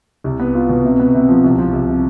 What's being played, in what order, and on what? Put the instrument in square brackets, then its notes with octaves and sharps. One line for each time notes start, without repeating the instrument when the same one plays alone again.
[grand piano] C2
B3
F4
B2
C3
B3
C3
F3
C2
F3
C2
C3